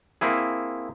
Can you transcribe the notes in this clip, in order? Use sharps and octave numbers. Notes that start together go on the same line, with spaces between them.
A#3 C4 E4 G#4